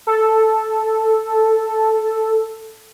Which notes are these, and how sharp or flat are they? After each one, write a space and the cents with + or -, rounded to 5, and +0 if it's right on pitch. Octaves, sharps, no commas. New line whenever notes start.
A4 +0